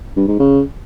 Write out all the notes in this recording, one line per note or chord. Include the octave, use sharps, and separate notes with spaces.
G2
G#2
C#3